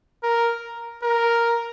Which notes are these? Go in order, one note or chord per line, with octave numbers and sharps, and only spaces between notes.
A#4
A#4